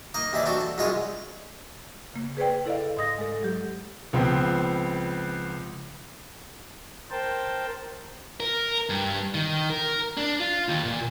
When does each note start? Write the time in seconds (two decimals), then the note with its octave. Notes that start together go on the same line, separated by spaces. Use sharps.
0.14 A#3 D#4 D#5
0.33 D#2 D#3 E3 E4 D5
0.46 C4 D4 F#4 A4
0.61 A5
0.78 C2 F#2 G#3 F4 C#5 D#6
2.14 C#3 A#3
2.37 G#4 B4 C5 D5 G5
2.66 E4 A4 D5 D#5 F5
2.97 G#2 D#5 D#6 A#6
3.19 G#3 A4
3.43 F#3 G4
4.13 C#2 F3 B3 C4
7.11 A#4 C5 G5 A5
8.40 A#4
8.89 G2
9.34 D#3
9.70 A#4
10.17 D4
10.40 F4
10.68 D#2
10.85 A#2